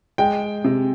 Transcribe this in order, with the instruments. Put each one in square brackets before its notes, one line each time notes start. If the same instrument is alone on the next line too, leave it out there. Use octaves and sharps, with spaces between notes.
[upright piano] G#3 [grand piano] G5
[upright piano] C3